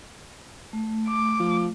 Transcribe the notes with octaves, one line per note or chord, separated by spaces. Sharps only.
A3
D6
F3